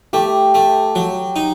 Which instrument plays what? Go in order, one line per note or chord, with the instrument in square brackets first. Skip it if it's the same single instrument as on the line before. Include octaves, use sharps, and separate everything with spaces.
[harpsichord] A3 [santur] G4
[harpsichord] A3
F#3
D#4